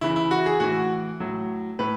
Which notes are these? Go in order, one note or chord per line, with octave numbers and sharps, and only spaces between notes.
C#3 E3 E4
E4
F#4
G#4
A2 E3 F#4
A2 F#3
A2 B4